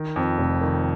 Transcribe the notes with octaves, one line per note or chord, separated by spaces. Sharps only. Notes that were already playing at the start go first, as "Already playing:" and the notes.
Already playing: D#3
F2
F1
D#3